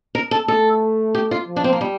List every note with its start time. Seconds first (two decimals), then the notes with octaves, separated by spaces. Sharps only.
0.15 A#4
0.31 A4
0.48 A3 A4
1.15 G4
1.31 F4
1.48 F3
1.56 D4
1.64 C4
1.73 A#3
1.81 G3